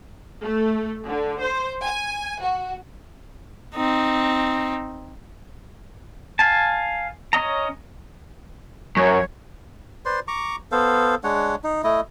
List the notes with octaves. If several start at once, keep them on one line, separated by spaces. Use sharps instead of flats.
A3
D3
C5
G#5
F#4
C4 D#4
F5 G#5 A5
C#4 C#5 D#5 A#5
F#2 C#5
B4 C5 D5 C6
A#5 C#6 D6
B3 A4 C5 F5
G#3 D4 C#5 F#5
D#4
A3 E4 D#5